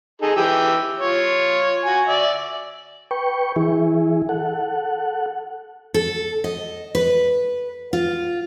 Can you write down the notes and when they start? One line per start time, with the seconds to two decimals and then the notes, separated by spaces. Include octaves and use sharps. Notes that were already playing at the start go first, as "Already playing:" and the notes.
0.22 D#4 G#4 A4
0.36 E3 G4 E6
0.98 F4 C#5
1.85 F#4 G#5
2.07 D5 E5
3.11 B4 G5 C#6
3.56 E3 E4 G#4
4.29 A4 F#5
5.94 A4
6.44 D#5
6.95 B4
7.93 F4